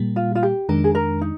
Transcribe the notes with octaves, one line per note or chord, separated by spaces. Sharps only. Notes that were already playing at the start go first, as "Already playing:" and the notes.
Already playing: A#2 G3 A#3
F4
F4
G4
F2 D#3 G#3 D4 A#4
G#4
A#4
D#4